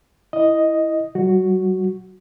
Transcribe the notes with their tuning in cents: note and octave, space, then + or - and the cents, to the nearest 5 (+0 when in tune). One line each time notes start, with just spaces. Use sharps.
E4 +0 D#5 +0
F#3 +45 F#4 +0